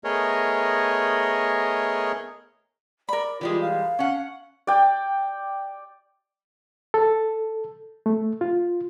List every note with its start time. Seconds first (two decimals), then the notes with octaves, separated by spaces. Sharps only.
0.04 A3 B3 G#4 A#4 C#5 D#5
3.09 A#4 D5 B5
3.41 E3 G3 G#3 F4
3.61 F5
3.99 C#4 F#5
4.67 D5 G5
6.94 A4
8.06 A3
8.41 F4